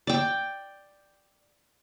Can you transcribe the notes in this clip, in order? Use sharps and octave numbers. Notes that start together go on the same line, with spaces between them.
D5 G5